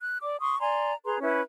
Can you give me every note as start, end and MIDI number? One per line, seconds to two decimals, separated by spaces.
0.02 0.18 90
0.22 0.40 74
0.22 0.40 86
0.40 0.59 84
0.40 0.59 85
0.40 0.59 87
0.60 0.93 74
0.60 0.93 80
0.60 0.93 82
0.60 0.93 84
1.05 1.18 68
1.05 1.18 71
1.05 1.18 82
1.05 1.18 84
1.20 1.42 61
1.20 1.42 64
1.20 1.42 71
1.20 1.42 76